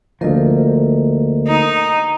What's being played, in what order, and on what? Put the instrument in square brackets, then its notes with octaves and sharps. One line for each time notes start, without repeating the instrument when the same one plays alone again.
[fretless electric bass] D2 F3 [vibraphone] A#3 A#4 D#5
[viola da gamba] D#4